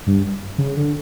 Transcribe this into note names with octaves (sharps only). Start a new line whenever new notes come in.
G2
C#3
D3